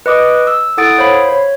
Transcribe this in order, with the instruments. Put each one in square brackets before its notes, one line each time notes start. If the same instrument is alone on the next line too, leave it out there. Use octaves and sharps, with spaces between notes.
[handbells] B4 D#5 D6 D#6
E6
E4 A4 F#5 D#6 A6 D7
C5 C#5 F5 B5
C#5